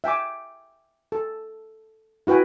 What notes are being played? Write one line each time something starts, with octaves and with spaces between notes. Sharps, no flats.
E5 G5 G#5 D6
A4
E4 F#4 B4 G5 G#5